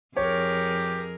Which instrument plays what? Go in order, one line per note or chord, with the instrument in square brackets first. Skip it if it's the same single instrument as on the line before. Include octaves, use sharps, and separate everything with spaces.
[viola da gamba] F2 G#4 A#4 [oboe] G4 [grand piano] C#5